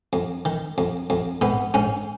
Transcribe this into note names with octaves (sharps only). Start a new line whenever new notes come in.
F2
D#3
F2
F2
G#2 B3
G#2 C#4